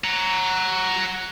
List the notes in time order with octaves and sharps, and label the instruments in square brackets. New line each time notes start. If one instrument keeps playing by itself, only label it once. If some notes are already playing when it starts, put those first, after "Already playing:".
[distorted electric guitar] F#5 A#5